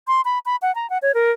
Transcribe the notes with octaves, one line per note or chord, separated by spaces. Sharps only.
C6
B5
B5
F#5
A#5
F#5
C#5
A#4